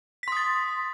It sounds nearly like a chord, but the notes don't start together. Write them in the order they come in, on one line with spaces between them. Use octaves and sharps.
B6 C6 D#6 A6